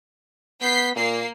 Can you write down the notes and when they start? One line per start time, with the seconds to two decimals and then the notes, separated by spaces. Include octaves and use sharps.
0.61 B3 G6 B6 C7
0.96 A#2 A#3 C7